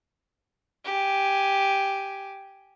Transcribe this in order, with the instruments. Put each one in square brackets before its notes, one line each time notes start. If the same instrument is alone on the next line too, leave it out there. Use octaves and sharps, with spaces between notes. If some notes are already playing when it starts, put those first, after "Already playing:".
[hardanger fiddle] G4 G#5